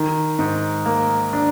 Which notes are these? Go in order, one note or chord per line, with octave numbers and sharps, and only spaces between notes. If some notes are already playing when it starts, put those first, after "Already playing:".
Already playing: D#3
G#2
A#3
D4